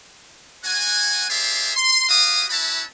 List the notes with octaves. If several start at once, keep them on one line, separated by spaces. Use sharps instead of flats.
C4 F#4 F#5 G#5
G4 G#4 C5 D5 E5 F5
C6
C#4 F#4 G4 F5 D#6
C#4 E4 F#4 E5 A5 B5